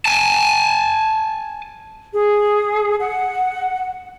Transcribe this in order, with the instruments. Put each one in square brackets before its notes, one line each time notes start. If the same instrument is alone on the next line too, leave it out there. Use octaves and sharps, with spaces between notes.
[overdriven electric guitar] G#5 A5
[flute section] G#4
F#5